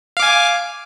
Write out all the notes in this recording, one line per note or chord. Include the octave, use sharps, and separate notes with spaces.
F5 G#5 D6